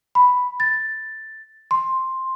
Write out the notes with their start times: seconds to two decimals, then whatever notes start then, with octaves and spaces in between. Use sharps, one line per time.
0.15 B5
0.60 A6
1.71 C6